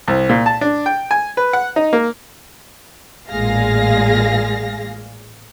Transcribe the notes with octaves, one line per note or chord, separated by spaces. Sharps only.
C2
A#2
A5
D4
G5
G#5
B4
F#5
D#4
A#3
A1 A#2 G#3 G#4 F5 A#6